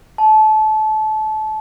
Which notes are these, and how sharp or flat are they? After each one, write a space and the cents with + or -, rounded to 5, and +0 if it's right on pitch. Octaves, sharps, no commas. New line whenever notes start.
A5 -25